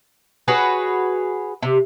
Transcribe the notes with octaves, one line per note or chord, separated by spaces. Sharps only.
F#4 G#4 B4 C#5
C3